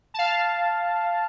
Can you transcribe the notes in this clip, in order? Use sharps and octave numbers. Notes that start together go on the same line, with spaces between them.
F5 A5